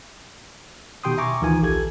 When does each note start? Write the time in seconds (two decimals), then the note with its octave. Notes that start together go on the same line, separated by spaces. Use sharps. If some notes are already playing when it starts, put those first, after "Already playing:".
1.04 B2 D#3 G4 G5 C6 D#6
1.18 E5 G#5 A#5 C#6 D6
1.41 D2 D#3 E3 F4 G#5
1.62 A#1 G4 A4 G#6